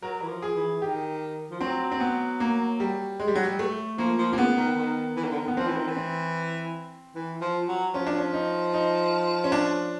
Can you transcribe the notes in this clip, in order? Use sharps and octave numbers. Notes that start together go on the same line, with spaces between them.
F#3 A#4
E3
F3
G#4
E3
D#3 G4
F3
F#3 C4
C4
B3
A#3
G3
G#3
G3
F#3
G3
A3
F3 A#3
F3
C3 A#3
C#3 B3
D#3
D#3
E3
D#3
D3
D#3
B3
F3 C4
E3
D#3
E3
C4
E3
F3
F#3
F3 C#4
D4
C#4
D#4
D#4
C#4
D4